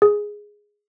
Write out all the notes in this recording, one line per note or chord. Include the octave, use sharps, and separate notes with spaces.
G#4